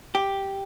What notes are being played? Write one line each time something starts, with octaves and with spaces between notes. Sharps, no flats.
G4